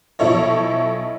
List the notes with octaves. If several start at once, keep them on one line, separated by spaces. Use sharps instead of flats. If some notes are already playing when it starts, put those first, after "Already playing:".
B1 F3 E4 A4 C#5 D#5